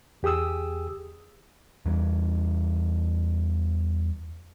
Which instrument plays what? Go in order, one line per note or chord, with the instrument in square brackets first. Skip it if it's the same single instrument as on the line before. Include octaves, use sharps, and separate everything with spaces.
[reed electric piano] E2 G4 G#4 D#6 E6
[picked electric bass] E2 E3 G3